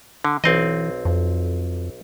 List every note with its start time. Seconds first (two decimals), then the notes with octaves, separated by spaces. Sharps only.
0.25 D3
0.44 B1 E3 C4 D#5
1.05 F2